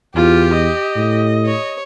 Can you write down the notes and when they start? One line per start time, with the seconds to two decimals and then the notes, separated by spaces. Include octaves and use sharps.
0.16 E2 F4 G4
0.53 D#5
0.96 A2
1.45 C#5